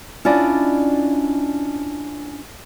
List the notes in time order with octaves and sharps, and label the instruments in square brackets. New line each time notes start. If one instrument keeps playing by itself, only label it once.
[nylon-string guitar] C#4 D4 E4 F4 D5 D#5